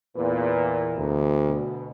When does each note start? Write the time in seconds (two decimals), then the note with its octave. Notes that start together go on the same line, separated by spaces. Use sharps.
0.17 E2 A#2 B4
0.98 D2
1.48 B2